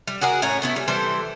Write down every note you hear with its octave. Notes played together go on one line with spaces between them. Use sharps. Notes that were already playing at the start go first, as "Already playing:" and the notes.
G3
F#4 G#4 A#4 F#5
A2 C#4 C#5 A#5
A3 B3 E4
G3
E3 G3 A4 C5